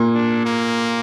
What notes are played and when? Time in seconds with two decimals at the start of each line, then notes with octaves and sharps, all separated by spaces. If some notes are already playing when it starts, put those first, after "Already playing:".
Already playing: A#2 A#3
0.14 D4
0.45 A#3